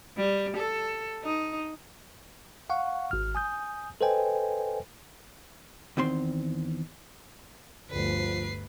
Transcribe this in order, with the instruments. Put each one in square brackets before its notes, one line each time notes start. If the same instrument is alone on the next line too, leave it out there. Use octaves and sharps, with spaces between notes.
[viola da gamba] G3
A4
D#4
[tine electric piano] F5 F#5 C#6
G#1 F6
G#5 D#6 G6
A4 B4 C5 D#5 G5 G#5
[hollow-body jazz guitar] E2 D#3 C4 C6
[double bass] G1 D2 [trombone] F3 [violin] B4 C7